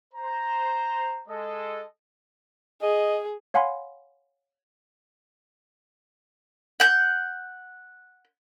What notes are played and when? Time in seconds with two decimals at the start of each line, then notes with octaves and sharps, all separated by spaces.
0.14 C5 A#5
1.28 G#3 A4 D#5
2.82 G#4 D#5
3.54 C#5 F5 F#5 G#5 B5 C6
6.80 F#5 G6